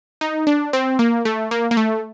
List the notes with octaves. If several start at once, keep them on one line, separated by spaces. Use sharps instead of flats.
D#4
D4
C4
A#3
A3
A#3
A#3
A3